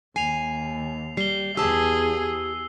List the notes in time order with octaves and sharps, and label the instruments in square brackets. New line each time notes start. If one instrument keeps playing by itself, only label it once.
[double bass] D#2 [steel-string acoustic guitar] G#5 [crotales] C7 F7
[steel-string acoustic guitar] G3 [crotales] C7 G7
[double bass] E2 [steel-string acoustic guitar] G4 A5 [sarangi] G#4 [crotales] E6